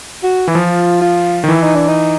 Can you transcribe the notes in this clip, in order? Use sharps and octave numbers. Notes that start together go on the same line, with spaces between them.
F#4
E3 E4
F3 F4
F4
D#3
E3 E4
D#4
D4
D#4